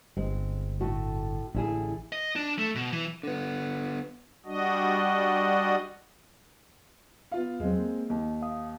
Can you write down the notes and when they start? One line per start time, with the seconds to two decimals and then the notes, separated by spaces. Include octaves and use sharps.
0.17 G1 G#3 C4
0.80 A2 A3 F#4
1.54 A1 D3 E4 G#4
2.12 D#5
2.36 D4
2.58 A3
2.75 B2
2.93 E3
3.23 D3 B3
4.46 G3 D4 F#4 D#5
7.32 B3 F4 F5
7.60 E2 F#3 G#3 C4
7.79 A#3
8.10 D#2
8.42 F5 D#6